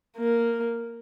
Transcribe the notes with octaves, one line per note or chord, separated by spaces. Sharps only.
A#3